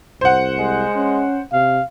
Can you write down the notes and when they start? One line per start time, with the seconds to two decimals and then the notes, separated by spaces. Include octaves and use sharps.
0.21 C2 C5 F#5
0.59 G#3
0.95 C#4
1.52 C3 F5